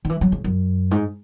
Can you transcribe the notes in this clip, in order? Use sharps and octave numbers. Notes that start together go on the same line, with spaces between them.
D#3
E3
F#3
C#3
F#2
G#2